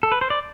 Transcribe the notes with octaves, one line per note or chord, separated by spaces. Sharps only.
A4
B4
C5
D5